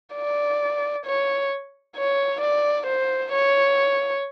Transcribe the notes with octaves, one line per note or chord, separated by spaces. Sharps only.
D5
C#5
C#5
D5
C5
C#5